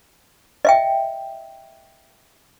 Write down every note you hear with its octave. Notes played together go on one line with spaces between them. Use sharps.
D#5 E5 G5